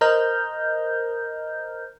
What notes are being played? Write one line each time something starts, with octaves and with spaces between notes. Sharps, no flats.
A#4 C5 D#5 A#5 F6 G6